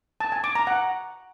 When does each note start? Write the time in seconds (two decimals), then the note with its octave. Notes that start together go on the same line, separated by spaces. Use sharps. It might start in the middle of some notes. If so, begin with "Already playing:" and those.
0.20 A5
0.32 G#5
0.44 D6
0.55 A#5
0.67 F#5